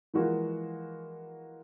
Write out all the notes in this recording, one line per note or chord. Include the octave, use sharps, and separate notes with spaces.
E3 F3 G#3 A#3 F#4